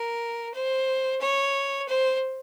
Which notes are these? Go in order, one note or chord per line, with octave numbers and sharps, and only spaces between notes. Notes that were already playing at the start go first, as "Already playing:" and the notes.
Already playing: A#4
C5
C#5
C5